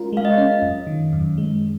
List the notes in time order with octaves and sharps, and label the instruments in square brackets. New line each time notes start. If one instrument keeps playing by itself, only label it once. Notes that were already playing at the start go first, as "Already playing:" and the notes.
Already playing: [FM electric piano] G#3 C#4 F4 A#4
[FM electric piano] G#3 [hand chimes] F5
[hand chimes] D#5
[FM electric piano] C#4
F#2
D#3
F#2
G#3